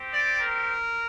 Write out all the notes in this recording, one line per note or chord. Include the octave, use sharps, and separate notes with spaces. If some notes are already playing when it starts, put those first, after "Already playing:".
Already playing: C4 G4
D5
A#4